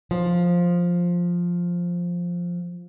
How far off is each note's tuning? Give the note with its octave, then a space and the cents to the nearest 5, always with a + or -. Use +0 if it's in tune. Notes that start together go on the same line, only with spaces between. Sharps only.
F3 +5